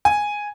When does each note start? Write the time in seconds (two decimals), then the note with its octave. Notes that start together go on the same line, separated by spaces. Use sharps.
0.05 G#5